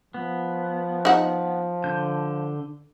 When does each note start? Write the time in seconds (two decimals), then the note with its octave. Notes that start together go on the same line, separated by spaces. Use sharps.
0.14 F3 B3
1.05 D#4 F#5
1.84 D3 G6